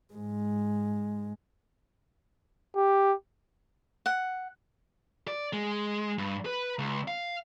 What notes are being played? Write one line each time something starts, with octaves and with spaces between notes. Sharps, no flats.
G#2 G#3
G4
F#5
D5
G#3
G2
B4
C#2
F5